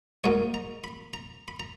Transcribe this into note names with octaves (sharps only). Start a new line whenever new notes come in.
G#2 F#3 A#3 D#4 C#5
A#5
B5
A#5
B5
A#5